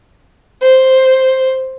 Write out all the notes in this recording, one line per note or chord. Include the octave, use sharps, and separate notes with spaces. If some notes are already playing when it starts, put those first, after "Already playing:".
C5